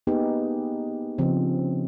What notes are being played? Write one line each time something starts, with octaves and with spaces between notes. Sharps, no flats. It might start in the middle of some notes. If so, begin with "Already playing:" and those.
A#3 B3 D#4 G4 G#4 B4
C#3 F3 C4